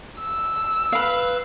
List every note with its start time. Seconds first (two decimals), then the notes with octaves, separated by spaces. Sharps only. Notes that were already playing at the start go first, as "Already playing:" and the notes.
0.21 E6
0.92 B4 F5